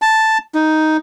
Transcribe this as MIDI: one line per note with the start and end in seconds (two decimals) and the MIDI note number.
0.02 0.38 81
0.55 0.97 63